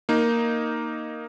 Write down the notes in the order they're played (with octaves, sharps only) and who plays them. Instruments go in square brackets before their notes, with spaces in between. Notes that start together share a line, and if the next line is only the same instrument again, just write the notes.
[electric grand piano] A#3 D#4